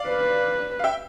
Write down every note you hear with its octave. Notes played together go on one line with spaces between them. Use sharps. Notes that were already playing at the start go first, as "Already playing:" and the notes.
Already playing: D5 F5
B4
F5
E5 G5